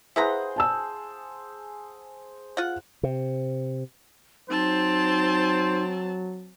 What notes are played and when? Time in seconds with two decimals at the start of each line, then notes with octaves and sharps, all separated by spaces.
0.16 E4 G#4 B4 C5 F#5 A#5
0.56 G#5 A5 E6
2.57 F4 F#5
3.03 C3
4.50 F#3 C4 D#4 C5 A5